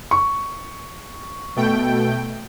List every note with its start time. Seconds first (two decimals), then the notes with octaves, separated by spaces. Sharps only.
0.11 C#6
1.56 B2 A3 G5